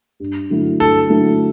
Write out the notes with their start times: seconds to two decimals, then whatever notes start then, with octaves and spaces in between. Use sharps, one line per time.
0.20 G2
0.50 D3 F#3 A3 E4
0.80 G2 A4
1.10 D3 F#3 A3 E4